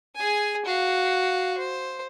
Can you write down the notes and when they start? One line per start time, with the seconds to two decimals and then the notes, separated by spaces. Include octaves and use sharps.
0.15 G#4 G#5
0.65 F#4 F5
1.58 C5